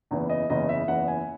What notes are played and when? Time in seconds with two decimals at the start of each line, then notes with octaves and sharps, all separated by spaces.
0.11 F#1 E2 C#3 E3
0.29 D#5
0.50 F#1 E2 C#3 E3 D#5
0.69 E5
0.88 F#1 E2 C#3 E3 F#5
1.08 G#5